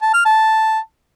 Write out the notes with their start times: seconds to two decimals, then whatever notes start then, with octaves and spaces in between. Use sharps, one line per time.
0.02 A5
0.14 F6
0.25 A5